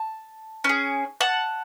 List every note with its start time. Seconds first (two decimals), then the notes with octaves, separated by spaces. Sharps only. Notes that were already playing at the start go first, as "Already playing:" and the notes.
Already playing: A5
0.64 C#4 G#4
1.21 F#5 A5